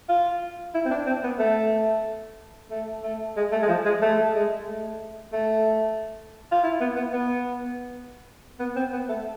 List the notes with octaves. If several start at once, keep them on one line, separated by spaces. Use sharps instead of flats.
F4
E4
C4
D4
C4
B3
A3
A3
A3
G#3
A3
G#3
F3
G#3
A3
G#3
A3
A3
F4
E4
B3
B3
B3
B3
C4
B3
A3